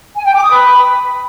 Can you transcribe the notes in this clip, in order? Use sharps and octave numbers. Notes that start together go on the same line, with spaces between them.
G#5
G5
D6
D#6
B4